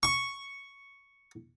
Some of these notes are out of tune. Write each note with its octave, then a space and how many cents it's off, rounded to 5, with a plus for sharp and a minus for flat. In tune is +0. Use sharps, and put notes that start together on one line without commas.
C#6 +0